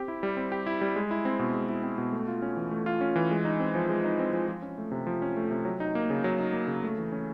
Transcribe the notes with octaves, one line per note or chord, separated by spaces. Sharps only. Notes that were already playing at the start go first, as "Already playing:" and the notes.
Already playing: C4 G4
E4
G3
C4
G4
E4
G3
G#3
E4
C4
B2
G#3
E4
C4
B2
A3
F4
C#4
E3
A3
F4
C#4
E3
G#3
D#4
C4
F3
G#3
D#4
C4
F3
F3
C#4
A3
C3
F3
C#4
A3
C3
F#3
D#4
A#3
C#3
F#3
D#4
A#3
C#3
A3
E3
C#4